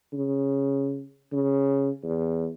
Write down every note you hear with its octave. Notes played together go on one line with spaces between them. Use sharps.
C#3
C#3
E2